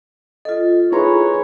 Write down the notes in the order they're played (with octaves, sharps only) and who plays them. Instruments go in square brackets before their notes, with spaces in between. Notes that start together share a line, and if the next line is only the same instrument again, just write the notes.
[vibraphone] F4 A4 [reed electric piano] D#5
[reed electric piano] D#4 A#5 C6 [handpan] E4 G#4 B4 [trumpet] C#5